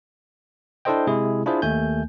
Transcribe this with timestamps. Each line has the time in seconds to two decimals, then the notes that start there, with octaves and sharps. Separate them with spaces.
0.85 D4 E4 A4 C5 D#5 G5
1.07 C3 G#3 E4 G#4
1.46 D4 E4 F4 G#4 C5
1.62 D#2 A3 G#5 G6